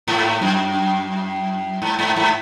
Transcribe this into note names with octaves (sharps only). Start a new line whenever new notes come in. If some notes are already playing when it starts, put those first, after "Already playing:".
G#2
F#2
G#2
G#2
G#2